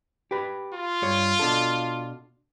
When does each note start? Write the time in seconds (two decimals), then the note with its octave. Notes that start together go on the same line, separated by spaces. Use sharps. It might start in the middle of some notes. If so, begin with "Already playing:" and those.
0.31 G4 B4
0.73 F4
1.02 G2 C#5
1.39 B2 D4 A4